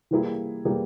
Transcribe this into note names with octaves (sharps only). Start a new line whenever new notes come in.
E3 G3 A#3 E4 G#4
E3 G3 A#3 E4 G#4